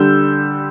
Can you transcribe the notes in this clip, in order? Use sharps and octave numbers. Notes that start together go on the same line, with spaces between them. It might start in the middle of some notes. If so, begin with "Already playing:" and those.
Already playing: D3 G3 E6 G6